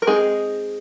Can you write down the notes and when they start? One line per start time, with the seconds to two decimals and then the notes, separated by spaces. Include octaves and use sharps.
0.02 A#4
0.07 G#3 C4 D#4 G#4